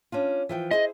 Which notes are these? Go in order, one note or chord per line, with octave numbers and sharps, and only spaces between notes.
C#4 D4 F4
E3 F3 G5
E4 G#4 C5 D#5